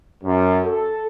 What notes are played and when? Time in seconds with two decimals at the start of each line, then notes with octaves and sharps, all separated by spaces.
0.24 F#2
0.64 A4